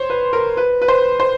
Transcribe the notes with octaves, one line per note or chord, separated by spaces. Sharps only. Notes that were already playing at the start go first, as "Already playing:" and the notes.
Already playing: C5 C#5
B4
A#4
B4
B4
C5
C5